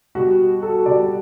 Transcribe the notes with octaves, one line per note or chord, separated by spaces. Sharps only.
B2 G3 F#4
A4
B2 G3 D5